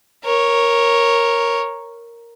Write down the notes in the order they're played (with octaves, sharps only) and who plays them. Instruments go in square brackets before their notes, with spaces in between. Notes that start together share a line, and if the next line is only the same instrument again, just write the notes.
[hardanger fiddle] A#4 C#5